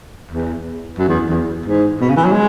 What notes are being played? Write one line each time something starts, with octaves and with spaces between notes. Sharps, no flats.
E2
F#2
E2
E2
G#2
B2
C#3
E3
F#3
G#3